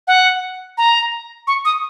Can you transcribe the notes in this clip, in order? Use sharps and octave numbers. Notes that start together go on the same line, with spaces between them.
F#5
A#5
C#6
D#6